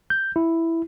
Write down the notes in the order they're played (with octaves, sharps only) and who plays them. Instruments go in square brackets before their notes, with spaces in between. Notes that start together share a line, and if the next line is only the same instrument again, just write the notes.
[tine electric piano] G6
E4